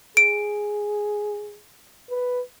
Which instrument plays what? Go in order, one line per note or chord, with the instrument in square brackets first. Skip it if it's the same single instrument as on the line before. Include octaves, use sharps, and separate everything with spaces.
[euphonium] G#4 [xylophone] D7
[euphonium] B4